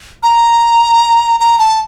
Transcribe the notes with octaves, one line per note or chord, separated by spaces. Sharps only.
A#5
A#5
A5